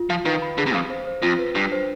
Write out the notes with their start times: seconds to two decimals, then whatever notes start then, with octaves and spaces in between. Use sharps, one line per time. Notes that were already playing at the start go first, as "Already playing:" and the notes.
Already playing: F4
0.10 F3 F5
0.25 D#3 B4
0.42 B5
0.58 D3 G#4
0.66 C3
0.74 F2 F5
0.90 C5
1.07 C5
1.22 F2 F4
1.39 B4
1.55 G2 D4
1.72 C5